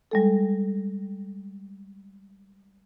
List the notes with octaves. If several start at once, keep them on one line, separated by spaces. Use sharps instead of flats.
G3 G#3 A4